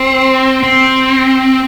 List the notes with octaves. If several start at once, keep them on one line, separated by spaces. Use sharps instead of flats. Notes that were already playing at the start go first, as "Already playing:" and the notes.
Already playing: C4
C4